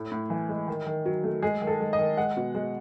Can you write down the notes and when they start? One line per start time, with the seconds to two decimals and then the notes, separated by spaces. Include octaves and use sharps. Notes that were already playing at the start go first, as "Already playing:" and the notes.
Already playing: A2 A3
0.12 A2
0.30 E3
0.49 G#3
0.68 D#3
0.86 D#3
1.05 F#3
1.24 A3
1.42 G#3 G#4
1.61 D#3
1.67 A4
1.81 G#3
1.93 D#5
1.99 D#3
2.17 G#3 F#5
2.37 B2
2.55 G#3